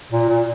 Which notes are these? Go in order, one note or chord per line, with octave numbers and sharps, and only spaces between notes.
A#2
A#2